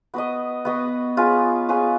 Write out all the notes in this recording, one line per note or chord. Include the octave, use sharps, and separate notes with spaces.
B3 F#4 B4 D#5
B3 F#4 B4 D#5
C#4 F4 G#4 B4
C#4 F4 G#4 B4